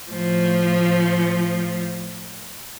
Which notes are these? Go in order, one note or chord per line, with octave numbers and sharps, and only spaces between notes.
A2 F3